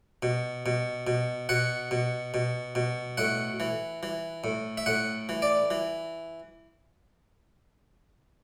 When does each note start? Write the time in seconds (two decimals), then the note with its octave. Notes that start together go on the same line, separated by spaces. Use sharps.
0.23 B2
0.66 B2
1.07 B2
1.49 B2 F#5
1.91 B2
2.34 B2
2.75 B2
3.18 A2 F#5
3.60 E3
4.03 E3
4.44 A2
4.78 E5
4.86 A2 F#5
5.29 E3
5.42 D5
5.71 E3